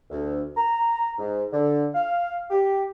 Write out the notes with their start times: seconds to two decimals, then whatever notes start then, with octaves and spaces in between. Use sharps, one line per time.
0.11 D2
0.56 A#5
1.19 G#2
1.51 D3
1.94 F5
2.51 G4